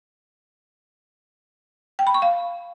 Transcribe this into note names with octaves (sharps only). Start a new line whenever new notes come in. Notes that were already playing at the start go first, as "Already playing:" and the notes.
G5
B5
C#6
F5